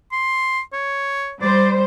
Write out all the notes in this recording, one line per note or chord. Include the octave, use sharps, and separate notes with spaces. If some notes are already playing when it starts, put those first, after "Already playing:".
C6
C#5
G3 C5 D5